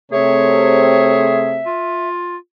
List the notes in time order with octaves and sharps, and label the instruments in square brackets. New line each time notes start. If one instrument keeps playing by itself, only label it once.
[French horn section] C3 A3 C4 [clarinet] G#4 [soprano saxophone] C#5 [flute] E5
[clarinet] F4